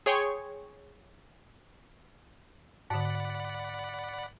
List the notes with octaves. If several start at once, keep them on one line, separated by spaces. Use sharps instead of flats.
G#4 C#5 G5 C6 C#6
G#2 D3 D5 F#5 B5